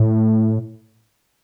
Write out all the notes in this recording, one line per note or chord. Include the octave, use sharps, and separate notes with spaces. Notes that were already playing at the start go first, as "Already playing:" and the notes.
Already playing: A2